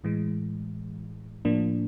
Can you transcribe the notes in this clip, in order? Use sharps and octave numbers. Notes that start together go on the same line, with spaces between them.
A2 E3 G#3
A2 F3 A#3 D4